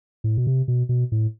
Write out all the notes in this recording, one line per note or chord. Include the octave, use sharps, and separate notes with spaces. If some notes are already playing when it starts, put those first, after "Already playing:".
A2
B2
C3
B2
B2
A2